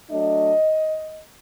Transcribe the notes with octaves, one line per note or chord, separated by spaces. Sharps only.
F#3 A3 D4 D#5